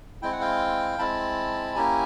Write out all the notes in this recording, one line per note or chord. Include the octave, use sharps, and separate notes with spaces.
G#3 C4 E4 G5
F#5
F5 G5
G#3 C4 E4 A5 B5
A#3 C#4 E4 G4 G#5 A#5